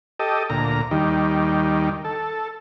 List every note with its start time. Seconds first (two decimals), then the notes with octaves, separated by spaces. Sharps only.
0.19 G4 A4 D#5
0.50 D2 A#2 A#5
0.91 D#2 D#3 G3
2.05 A4